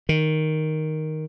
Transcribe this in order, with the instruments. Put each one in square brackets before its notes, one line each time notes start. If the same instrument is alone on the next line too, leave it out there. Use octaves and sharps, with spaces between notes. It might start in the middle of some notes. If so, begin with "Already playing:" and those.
[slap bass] D#3